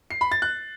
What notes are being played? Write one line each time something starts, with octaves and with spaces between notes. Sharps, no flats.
C7
B5
A6
F#6